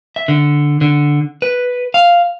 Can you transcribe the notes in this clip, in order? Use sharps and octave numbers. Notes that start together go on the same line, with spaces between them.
E5
D3
D3
B4
F5